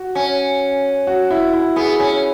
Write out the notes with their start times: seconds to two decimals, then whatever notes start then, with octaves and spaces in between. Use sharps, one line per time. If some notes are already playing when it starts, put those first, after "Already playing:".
Already playing: F#4
0.15 C#4
1.07 F#4
1.30 E4
1.54 E4
1.76 B3 G#4
1.99 C#4